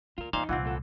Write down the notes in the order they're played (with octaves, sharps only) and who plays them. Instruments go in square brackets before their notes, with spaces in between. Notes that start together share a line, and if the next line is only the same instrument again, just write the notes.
[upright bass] D2 [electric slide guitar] F4 A#4
[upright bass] E2 [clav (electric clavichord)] A#2 C5 F5 [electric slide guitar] D#4
[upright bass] C2 A#2 [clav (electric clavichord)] E3 C4 [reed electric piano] F4 F#5
[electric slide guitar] F#2 A3 A4